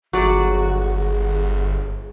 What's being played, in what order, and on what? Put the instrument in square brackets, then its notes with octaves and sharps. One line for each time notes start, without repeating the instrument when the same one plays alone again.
[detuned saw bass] G1 [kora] F#3 D5 [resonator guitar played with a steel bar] F#4 [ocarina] G#4